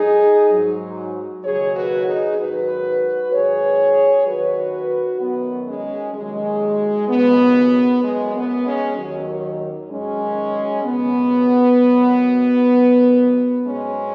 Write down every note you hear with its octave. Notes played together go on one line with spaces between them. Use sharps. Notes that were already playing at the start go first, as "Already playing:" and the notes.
Already playing: G#2 F#3 D#4 G#4
G#2 F#3
D#2 C#3 F#3 G#4 C#5
F#4 B4
D#4 G#4
G#2 D#3 F#3 F#4 B4
G#2 D#3 F#3 G#4 C#5
D#2 D#3 F#3 F#4 B4
F#2 D#3 F#3 B3
G#3 C#4
D#2 D#3 F#3 G#3
D#2 C#3 F#3 B3
F#2 F#3 G#3
B3
G#3 C#4
D#2 D#3 F#3
G#2 D#3 F#3 G#3 C#4
D#2 C#3 F#3 B3
G#2 D#3 F#3
F#2 D#3 F#3
G#2 F#3 G#3 C#4